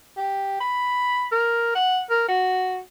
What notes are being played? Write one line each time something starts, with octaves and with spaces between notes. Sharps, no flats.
G4
B5
A#4
F#5
A#4
F#4